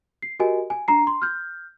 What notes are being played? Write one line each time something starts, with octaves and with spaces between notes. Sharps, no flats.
C7
F#4 G4 A#4 D#5 G#5
G#5
D4 A#5 C7
C6
F6 G6